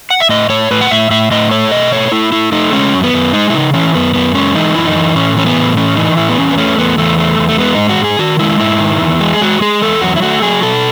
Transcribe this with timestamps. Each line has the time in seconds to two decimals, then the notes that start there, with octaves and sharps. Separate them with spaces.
0.10 F#5
0.20 E5
0.29 A2 D#5
0.49 A2 C#5
0.71 A2 B4
0.81 F#5
0.91 A2 E5
1.10 A2 E5
1.31 A2 D#5
1.51 A3 C#5
1.71 B2 D#5
1.92 A3 C#5
2.12 A3 E4
2.32 A3 E4
2.52 A3 D#4
2.72 G#3 C#4
2.93 F#2
3.04 B3
3.13 F#2
3.33 G#3 D#4
3.50 E4
3.54 C#3 D#4
3.74 E3 C#4
3.94 F#2 B3
4.14 F#2 B3
4.34 G#3 C#4
4.55 E3 D#4
4.75 F#2 E4
4.85 D#4
4.96 E3
5.16 A2 C#4
5.36 E3 C#4
5.46 B3
5.56 A2
5.77 E3 C#4
5.96 E3 D#4
6.17 A2 E4
6.29 B3
6.38 E2 C#4
6.51 B3
6.58 A3 C#4
6.78 E2 B3
6.98 E2 A3
7.18 A3
7.38 E2
7.49 A3
7.58 G#3 B3
7.75 G#2 D#4
7.89 F#4
7.99 G#2
8.04 G#4
8.19 D#3 F#4
8.39 G#3 E4
8.60 G#2 E4
8.80 D#3
9.01 E2
9.21 G#3
9.34 G#4
9.41 G#3 F#4
9.61 G#3 G#4
9.82 E2 A4
10.01 F#3 F#4
10.16 E4
10.22 A3 F#4
10.42 F#3 G#4
10.62 B2 A4